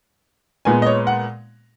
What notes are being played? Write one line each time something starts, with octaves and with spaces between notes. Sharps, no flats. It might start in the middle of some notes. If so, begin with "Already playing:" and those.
A#2 G#3 B3 G#5
D#5
C#5
F#5